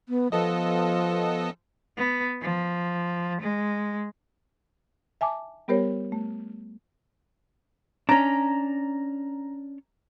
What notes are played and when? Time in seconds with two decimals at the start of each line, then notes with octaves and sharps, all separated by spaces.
0.09 B3
0.32 F3 B3 A4 D#5
1.97 B3
2.42 F3
3.42 G#3
5.21 E5 G#5 A5 D6
5.68 G3 B3 G4 A#4 C5 C#5
6.12 A3
8.09 C#4 D4 A#5